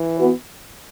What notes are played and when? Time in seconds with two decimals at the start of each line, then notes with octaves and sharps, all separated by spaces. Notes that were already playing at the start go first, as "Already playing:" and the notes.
Already playing: E3
0.18 B3 F#4 B4